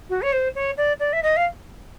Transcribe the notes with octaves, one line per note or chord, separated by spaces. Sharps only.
F#4
C#5
C5
C#5
D5
D5
E5
D#5
F5